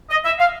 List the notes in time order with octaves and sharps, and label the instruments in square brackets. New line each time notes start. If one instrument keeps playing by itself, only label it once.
[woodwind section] D#5
E5
F5